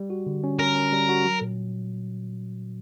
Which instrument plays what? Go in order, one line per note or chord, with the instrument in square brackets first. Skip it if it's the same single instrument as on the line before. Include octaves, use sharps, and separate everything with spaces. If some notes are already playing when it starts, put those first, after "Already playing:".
Already playing: [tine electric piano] G3
F#4
D3
C#4
[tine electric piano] C#4 [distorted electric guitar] A#4
[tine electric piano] C#4
G3
F#4
F#3
A#2